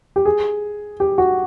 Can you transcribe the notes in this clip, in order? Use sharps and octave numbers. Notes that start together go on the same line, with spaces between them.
G4
G#4
G4
F#4